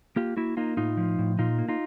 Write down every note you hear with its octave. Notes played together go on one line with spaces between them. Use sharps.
A#3 F4 G4
A#3 E4 F#4
A#3 D#4 F4
A2 D#4 F4
F3
A2
A#2 D#4 F4
A#3
D#4 F4